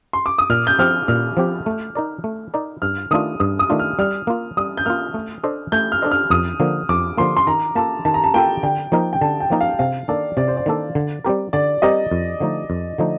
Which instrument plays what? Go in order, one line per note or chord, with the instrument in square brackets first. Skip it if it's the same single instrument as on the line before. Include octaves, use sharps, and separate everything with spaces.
[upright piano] C6
D6
D#6
[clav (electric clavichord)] A#2 [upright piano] F6
[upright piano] G6
[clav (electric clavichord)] F3 C4 G4 [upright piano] F6
[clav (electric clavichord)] A#2 [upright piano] F6
[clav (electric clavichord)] F3 C4 G4
A3
D#4 A#4 D5
A3
D#4 A#4 D5
[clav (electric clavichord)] G2 [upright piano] F6
[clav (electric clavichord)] D#3 A3 D4 F4 [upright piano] D#6
[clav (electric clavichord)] G2 [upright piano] D#6
[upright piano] D#6
[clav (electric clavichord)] D#3 A3 D4 F4
[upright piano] F6
[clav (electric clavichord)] G3 [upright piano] F6
[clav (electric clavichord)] A#3 F4
[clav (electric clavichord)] G3 [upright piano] D#6
[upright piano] G6
[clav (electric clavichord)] A#3 F4 [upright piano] F6
[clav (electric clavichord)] A3
D4 A4 C5 D#5
[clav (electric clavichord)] A3 [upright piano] G6
[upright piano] F6
[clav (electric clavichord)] D4 A4 C5 D#5
[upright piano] F6
[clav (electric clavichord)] F2 [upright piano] D#6
[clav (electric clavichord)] D3 F3 A#3
[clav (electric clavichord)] F2 [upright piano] D6
[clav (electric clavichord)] D3 F3 A#3 [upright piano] C6
[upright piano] C6
[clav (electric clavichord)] D#3 [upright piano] A#5
[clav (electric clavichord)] A#3 F4 A4 [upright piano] A5
[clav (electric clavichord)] D#3 [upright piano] A5
[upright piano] A#5
A5
[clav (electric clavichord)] A#3 F4 A4 [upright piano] G5
[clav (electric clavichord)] D3 [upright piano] G5
[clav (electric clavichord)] F3 A#3 D#4 A#4
[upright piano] G5
[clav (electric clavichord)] D3 [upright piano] A5
[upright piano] G5
[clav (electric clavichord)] F3 A#3 D#4 A#4
[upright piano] F5
[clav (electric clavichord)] C3 [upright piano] F5
[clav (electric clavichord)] D#3 A#3 D4 A4 [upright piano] D5
[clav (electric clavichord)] C3 [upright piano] D5
[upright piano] C5
D5
[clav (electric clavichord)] D#3 A#3 D4 A4
D3
G3 C4 G4 A#4
[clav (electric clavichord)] D3 [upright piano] D5
[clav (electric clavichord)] G3 C4 G4 A#4 [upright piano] D#5
[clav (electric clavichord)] F2
D3 F3 A3 D#4
F2
D3 F3 A3 D#4